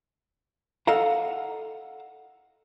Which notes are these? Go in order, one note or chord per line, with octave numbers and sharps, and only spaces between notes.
A4 D#5 F5 F#5 A#5